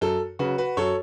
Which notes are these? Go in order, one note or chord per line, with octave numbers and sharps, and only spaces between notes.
F#2 A4
C#3 F#3 F#4 B4
F#4 B4
F#2 A4 C#5